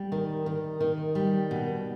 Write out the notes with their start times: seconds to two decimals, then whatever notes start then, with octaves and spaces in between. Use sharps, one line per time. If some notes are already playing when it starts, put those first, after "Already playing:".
Already playing: G3
0.12 D#3
0.46 D#3
0.80 D#3
1.15 G3
1.51 B2